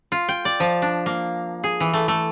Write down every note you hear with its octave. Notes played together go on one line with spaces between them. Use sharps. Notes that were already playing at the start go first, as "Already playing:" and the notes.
F4
G5
D5
F3
D4
A#3
G#4
E3
A3
A3